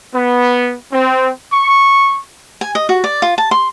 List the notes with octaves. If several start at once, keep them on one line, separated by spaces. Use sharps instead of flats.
B3
C4
C#6
G#5
D#5
F#4
D5
F4
A5
C6